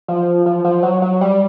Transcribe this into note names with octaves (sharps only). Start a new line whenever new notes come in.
F3
F3
F3
F#3
F#3
G3